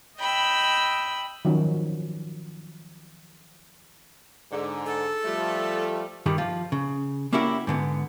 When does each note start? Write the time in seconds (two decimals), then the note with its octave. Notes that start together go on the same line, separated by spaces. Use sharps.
0.19 D#5 G5 B5 E6
1.45 D#3 F3 F#3 C#4 F#4
4.52 G#2 D3
4.86 A4
5.25 F3 G3 A3
6.26 G2 D#3 G3
6.38 F3 F4
6.72 C#3
7.33 A#3 C#4 D4 E4 F#4 G4
7.67 G#2 D3 B3